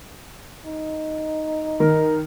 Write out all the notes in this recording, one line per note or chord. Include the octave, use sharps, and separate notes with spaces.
D#4
D#3 A#4